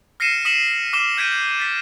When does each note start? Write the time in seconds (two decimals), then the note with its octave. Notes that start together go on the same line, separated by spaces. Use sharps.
0.20 F6 A#6 C7 C#7 D#7 E7
0.45 D#6 B6 C#7 E7 F#7
0.93 D6 F6 E7 G7
1.17 F6 G6 G#6 B6 D7 D#7
1.59 A6 B6